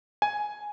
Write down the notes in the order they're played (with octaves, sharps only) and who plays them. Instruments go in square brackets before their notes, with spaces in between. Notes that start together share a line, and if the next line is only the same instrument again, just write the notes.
[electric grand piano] G#5